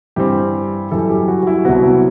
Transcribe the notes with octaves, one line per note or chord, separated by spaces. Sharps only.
G2 E3 G3 C4 G4
F#2 E3 G3 A4
G4
F#4
F#4
E4
C2 C3 F#3 B3 F#4
E4